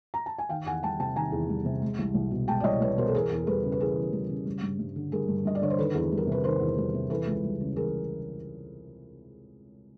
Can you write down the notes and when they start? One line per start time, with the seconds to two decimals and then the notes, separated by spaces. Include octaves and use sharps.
0.14 A#5
0.26 A5
0.38 G#5
0.49 D#3 F5 G5
0.66 E2 F#5 G#5
0.83 G3 G5 A5
1.00 C3 G5 A5
1.16 D#3 G#5 A#5
1.32 E2
1.50 G3
1.65 C3
1.82 G#3
1.99 C2
2.14 C2
2.31 B2
2.48 G#3 G5 A5
2.60 D5
2.64 C2 C#5 D#5
2.81 C2 B4 C#5
2.98 B2 A#4 C5
3.08 A4
3.14 E3 G#4 A#4
3.31 E2
3.47 G3 A4 B4
3.63 C#3
3.72 B4
3.80 E3 G#4 A#4
3.96 E2
4.13 G3
4.29 C#3
4.46 G3
4.62 G2
4.79 G2
4.96 D3
5.12 G3 G#4 A#4
5.28 G2
5.45 G2 D#5
5.55 D5
5.62 D3 C#5
5.70 C5
5.78 D#3 A4 B4
5.94 E2
6.12 G3
6.17 A#4
6.27 C3 B4
6.44 D#3 A#4 C5
6.60 E2
6.78 G3
6.94 C3
7.10 E3 A4 B4
7.27 C#2
7.44 G3
7.61 C#3
7.76 E3 G#4 A#4